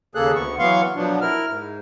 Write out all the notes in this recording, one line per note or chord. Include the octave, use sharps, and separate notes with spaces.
D#2 C#3 A#3 G#4 A4 F#6
D2 B3 C#6
E3 F#3 B3 F5 C6 C#6
B2 F3 F#3 B3 D4
E4 A#4 F6
G#2